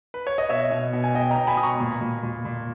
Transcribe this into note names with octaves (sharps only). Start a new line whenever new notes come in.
B4
C#5
D#5
B2 C#5 E5
B2
B2
G#5
B2 D#5 G5
G5 A#5
B2
G#5 B5
B2 D#6
A#5 C#6
A#2
A#2
A#2
A#2